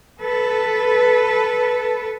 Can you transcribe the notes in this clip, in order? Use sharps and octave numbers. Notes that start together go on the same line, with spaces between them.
A4 B4